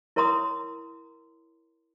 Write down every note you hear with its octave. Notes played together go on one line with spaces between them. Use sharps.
E4 A#4 C#5 A#5 C6 D#6